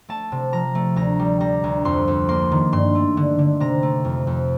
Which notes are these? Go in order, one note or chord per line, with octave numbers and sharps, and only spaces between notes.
A3 A5
C3
F3 A#5
A3
D2 A#5
G3
G3 A#5
D2
F2 C6
F2
A#3 C6
D#3
G2 C6
A3
D3
D3
C3 A#5
A3
F2
F2